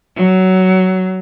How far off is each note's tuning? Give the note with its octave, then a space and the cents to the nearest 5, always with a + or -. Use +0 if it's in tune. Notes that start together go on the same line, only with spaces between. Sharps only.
F#3 +15